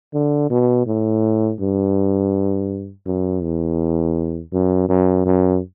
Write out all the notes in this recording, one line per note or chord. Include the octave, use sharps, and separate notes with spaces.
D3
B2
A2
G2
F#2
E2
F#2
F#2
F#2